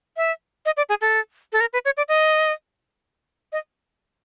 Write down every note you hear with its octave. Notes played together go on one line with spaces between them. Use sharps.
E5
D#5
D5
G#4
A4
A4
A#4
B4
C#5
D5
D#5
D#5